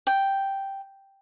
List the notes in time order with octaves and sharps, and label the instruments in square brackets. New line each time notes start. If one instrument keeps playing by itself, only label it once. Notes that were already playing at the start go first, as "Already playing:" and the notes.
[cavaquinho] G5